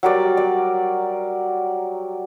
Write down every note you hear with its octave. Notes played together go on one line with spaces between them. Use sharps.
F#3 G3 A#4 D5
D5